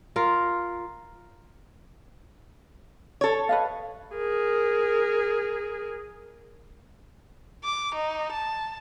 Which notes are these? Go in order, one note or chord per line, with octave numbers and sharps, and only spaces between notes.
F4 A#4
A4 C#5
B4 D#5 F5
G#4 A#4
D6
D#4
A5